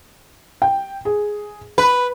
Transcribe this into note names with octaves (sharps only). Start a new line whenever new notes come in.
G5
G#4
B4 B5